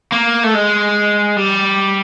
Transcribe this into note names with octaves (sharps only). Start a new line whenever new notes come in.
A#3
A3
G#3
G3